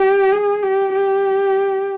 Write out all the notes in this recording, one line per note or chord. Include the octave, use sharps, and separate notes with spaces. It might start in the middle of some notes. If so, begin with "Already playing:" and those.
Already playing: G4
G#4
G4
G4